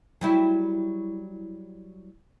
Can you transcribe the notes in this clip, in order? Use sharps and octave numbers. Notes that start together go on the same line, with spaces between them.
F#3 G3 E4